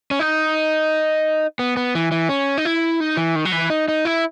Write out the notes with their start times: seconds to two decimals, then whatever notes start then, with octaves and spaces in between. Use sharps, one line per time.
0.11 C#4
0.19 D#4
1.59 B3
1.77 B3
1.95 E3
2.12 E3
2.29 C#4
2.57 D#4
2.65 E4
3.00 D#4
3.17 E3
3.36 D#3
3.45 F#3
3.52 E3
3.70 D#4
3.88 D#4
4.05 E4